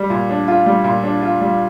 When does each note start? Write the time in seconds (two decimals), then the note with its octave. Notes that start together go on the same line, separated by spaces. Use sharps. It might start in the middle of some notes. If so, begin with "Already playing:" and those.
Already playing: G3
0.10 A#2
0.29 D4
0.48 F4
0.66 G3
0.84 A#2
1.04 D4
1.22 F4
1.41 G3